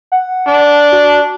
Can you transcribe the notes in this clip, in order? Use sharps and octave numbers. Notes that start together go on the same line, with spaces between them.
F#5
D4
F#4